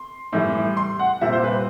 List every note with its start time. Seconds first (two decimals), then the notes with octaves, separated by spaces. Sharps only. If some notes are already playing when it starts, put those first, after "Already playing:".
Already playing: C6
0.33 A2 E3 G3
0.77 C6
0.99 F#5
1.21 A#2 G3 C4 E5
1.33 C5
1.44 B4